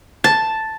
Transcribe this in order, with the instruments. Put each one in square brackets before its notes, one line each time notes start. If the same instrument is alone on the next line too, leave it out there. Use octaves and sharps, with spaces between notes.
[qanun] A5